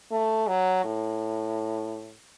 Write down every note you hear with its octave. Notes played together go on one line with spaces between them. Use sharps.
A3
F#3
A2